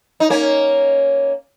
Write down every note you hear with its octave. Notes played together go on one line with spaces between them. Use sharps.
D#4
A#3 C#4